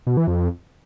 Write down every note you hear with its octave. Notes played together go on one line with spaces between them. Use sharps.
B2
E3
F2